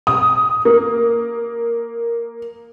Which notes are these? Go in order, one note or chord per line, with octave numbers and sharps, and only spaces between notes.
D#6
A#3